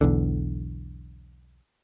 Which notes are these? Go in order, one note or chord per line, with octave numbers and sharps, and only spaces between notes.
B1 E2 D3